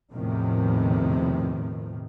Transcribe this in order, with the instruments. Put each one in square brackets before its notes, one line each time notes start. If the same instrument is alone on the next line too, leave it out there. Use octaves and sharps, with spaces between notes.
[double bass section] E2 A2 C3 D#3 F3